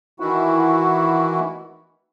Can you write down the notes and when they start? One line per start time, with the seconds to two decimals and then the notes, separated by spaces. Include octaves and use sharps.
0.20 D#3 E3 E4 F#4